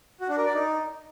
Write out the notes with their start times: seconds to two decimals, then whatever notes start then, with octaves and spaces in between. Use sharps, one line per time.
0.20 F#4
0.29 D4
0.37 A#4
0.46 D5
0.54 D#4